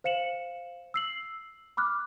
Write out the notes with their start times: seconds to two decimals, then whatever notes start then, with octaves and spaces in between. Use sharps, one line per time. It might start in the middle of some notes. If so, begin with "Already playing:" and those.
0.04 C5 F5 C#7 E7 F#7
0.94 E6 C7 F#7
1.77 B5 D6 F6 F#6